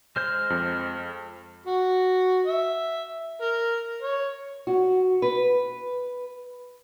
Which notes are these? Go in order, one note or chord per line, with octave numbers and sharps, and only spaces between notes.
G#3 C5 F6 G6
F2
F#4
E5
A#4
C#5
F#4
B4